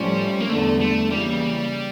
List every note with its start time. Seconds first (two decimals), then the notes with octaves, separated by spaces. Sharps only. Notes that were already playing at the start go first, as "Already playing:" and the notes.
Already playing: A2 F3 G3 A3 C#4
0.40 A#3
0.49 E2 D3 G3 A3
0.80 A3
1.10 C#3 E3 G3 A#3